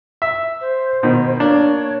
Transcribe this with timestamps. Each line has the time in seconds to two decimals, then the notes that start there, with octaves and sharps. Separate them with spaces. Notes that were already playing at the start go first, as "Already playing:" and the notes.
0.22 E5
0.61 C5
1.03 B2 D#3
1.40 A#3 D4 C#5